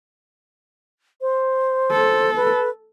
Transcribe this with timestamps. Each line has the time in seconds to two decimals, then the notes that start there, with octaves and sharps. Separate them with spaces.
1.21 C5
1.92 A4
2.36 B4